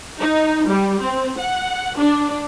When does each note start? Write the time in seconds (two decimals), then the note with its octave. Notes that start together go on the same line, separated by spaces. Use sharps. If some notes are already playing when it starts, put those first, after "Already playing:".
0.20 D#4
0.67 G3
1.01 C4
1.38 F#5
1.98 D4